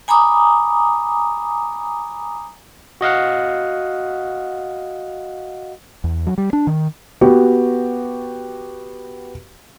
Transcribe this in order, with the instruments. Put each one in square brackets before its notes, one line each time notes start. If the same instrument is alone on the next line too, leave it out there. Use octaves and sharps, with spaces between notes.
[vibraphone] G#5 A#5 B5 D6 D#6
[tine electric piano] F#4 D#5 F5 F#5
[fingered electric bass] E2
F#3
G3
D4
D#3
[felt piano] B3 F#4 G4